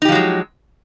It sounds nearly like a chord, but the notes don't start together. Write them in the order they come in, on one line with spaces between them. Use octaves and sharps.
D#4 G4 F3 F#3 G#3